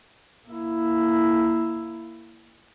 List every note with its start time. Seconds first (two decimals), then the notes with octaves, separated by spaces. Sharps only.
0.48 A#3 E4